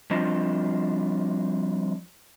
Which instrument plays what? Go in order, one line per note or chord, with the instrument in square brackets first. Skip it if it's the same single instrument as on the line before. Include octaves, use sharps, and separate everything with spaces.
[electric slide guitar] F3 G3 C4 D4 F4 D#5